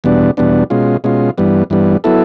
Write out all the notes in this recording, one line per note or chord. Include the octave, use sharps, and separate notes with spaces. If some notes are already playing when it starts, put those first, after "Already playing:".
E2 B2 G3 B3 D4
E2 B2 G3 B3 D4
B2 G#3 C#4 F4
B2 G#3 C#4 F4
G2 E3 G3 B3
G2 E3 G3 B3
F#3 B3 E4 A4